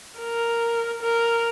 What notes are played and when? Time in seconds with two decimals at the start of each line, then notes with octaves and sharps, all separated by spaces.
0.19 A#4
1.02 A#4